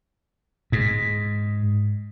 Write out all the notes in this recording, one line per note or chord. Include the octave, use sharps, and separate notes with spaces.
G#2